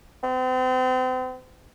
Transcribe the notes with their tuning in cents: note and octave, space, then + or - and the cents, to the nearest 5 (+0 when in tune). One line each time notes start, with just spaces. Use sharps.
C4 -35